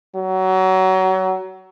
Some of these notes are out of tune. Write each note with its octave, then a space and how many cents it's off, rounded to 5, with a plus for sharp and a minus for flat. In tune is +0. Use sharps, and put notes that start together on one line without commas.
F#3 +25